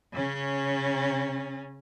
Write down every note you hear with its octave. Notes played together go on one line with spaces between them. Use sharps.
C#3 C#4